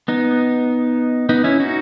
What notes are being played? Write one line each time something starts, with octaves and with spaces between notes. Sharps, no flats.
B3 D#4
B3 D#4
C#4 E4
D#4 F#4